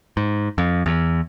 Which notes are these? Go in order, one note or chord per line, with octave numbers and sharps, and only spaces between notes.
G#2
F2
E2